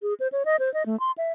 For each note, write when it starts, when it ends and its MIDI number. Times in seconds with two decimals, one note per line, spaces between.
0.02 0.14 68
0.20 0.28 72
0.32 0.43 73
0.45 0.56 75
0.59 0.72 72
0.74 0.86 75
0.86 0.99 57
1.00 1.11 84
1.18 1.32 76